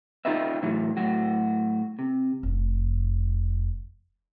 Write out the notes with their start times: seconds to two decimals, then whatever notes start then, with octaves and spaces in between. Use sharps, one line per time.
0.25 D#4 F4 G4 B4 D#5 E5
0.62 A2 E3 F#3
0.97 A2 F#3 F#4
1.99 C3
2.43 F1 F2